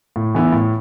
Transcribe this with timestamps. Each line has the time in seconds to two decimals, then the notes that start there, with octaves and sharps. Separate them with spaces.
0.16 A2
0.35 E3 B3 E4
0.53 A2